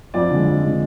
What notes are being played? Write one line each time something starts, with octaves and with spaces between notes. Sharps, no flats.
F2 D5
D3 G#3
F2
D3 G#3